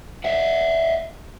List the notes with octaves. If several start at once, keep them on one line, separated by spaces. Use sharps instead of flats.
D#5 E5 F#5